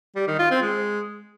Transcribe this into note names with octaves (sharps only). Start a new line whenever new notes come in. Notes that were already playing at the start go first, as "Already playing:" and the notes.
G3
D#3
F4
C4
G#3